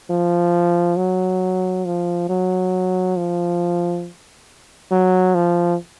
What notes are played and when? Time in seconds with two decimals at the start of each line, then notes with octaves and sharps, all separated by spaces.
0.10 F3
0.97 F#3
1.85 F3
2.29 F#3
3.17 F3
4.91 F#3
5.35 F3